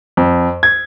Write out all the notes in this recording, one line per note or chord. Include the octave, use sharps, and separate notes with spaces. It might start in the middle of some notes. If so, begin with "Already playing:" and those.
F2
G#6